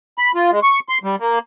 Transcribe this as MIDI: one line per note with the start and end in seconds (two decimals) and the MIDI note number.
0.18 0.32 83
0.35 0.51 65
0.51 0.60 56
0.63 0.80 85
0.89 0.98 84
1.04 1.16 55
1.20 1.39 58